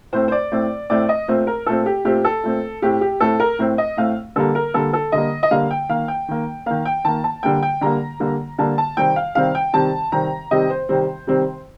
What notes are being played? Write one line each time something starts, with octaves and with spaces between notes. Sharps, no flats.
A2 A3 C4 C5
C5
D5
A2 A3 C4
A2 A3 C4 D5
D#5
A#2 A3 C4 C5
A#4
A#2 A3 C4 A4
G4
A#2 A3 C4 G4
A4
A#2 A3 C4
A2 A3 C4 G4
G4
A2 A3 C4 A4
A#4
A2 A3 C4
D#5
A2 A3 C4 F5
D3 G3 A#3 A4
A#4
D3 G3 A#3 A4
A4
D3 G3 A#3 D#5
D#5
D3 G3 A#3 F5
G5
D#3 A#3 F5
G5
D#3 A#3
D#3 A#3 F5
G5
D#3 A#3 A5
A5
D3 G3 A#3 G5
G5
D3 G3 A#3 A#5
D3 G3 A#3
D3 G3 A#3 A5
A5
C3 D#3 G3 C4 G5
F5
C3 D#3 G3 C4 F5
G5
C3 D#3 G3 C4 A5
C3 D#3 G3 C4 A#5
C3 D#3 G3 C4 D#5
C5
C3 D#3 G3 C4
C3 D#3 G3 C4